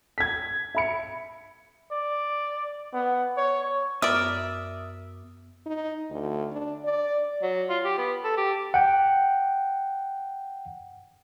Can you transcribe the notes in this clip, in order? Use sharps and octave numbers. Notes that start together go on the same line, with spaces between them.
G#6 B6
E5 B5 C#7
D5
B3
C#5
F#2 B3 A#4 D5 E5 D#6 F6
D#4
D2
D4
D5
F#3
F4
G4
B3
A4
G4
F#5 G5